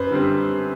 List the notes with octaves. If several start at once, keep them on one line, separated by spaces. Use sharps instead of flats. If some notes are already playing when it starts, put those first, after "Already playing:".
Already playing: F#2 B4 C5
D3 G3 C4